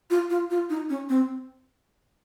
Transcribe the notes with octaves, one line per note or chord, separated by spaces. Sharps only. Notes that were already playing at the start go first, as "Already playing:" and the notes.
F4
F4
F4
D#4
C#4
C4